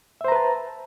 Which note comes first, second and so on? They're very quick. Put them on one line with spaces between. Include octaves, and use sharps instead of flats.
E5 C5 A#5 B4 A5